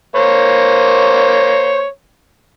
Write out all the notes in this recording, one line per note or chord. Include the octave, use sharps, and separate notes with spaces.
A#3 C5 C#5